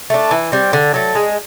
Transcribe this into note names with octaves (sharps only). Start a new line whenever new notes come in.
A3 D4
E3
G3 C4
D3
F#3 A3
G#3